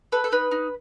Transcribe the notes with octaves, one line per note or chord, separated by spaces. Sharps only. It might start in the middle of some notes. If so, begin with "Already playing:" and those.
A4 B4
A4
D#4 B4
D#4